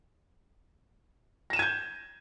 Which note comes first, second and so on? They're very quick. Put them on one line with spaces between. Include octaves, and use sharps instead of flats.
A#6 E7 D#7 G#6 G6